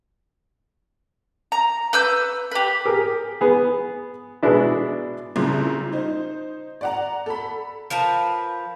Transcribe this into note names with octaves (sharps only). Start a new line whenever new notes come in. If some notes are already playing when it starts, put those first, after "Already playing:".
A#5
B4 E6 G6
G4 B4
G4 G#4 A#4
B3 G#4
B2 G#3 B3 D4 E4
C2 A#2 C#3 E4 C6
D#4 C5
D5 F#5 A#5
A4 B5
F3 A#4 B4 A5